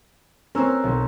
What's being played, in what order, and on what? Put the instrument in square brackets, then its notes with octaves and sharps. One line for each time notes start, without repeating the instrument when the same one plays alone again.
[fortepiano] C4 C#4 [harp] A#4 E6 F#6
[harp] B1